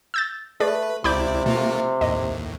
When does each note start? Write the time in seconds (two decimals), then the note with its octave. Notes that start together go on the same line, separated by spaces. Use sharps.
0.14 E6 G6 A6
0.60 A3 G#4 B4 D5
1.04 C#2 C3 E4 D5 B5 D6 G6
1.46 B2 A3 A#3 F4
2.01 D#2 A2 D#5